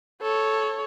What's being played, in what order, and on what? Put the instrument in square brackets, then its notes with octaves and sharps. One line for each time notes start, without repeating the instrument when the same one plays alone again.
[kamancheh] A4 C#5